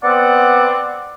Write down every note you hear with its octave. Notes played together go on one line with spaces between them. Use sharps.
B3 C4 D5 F#5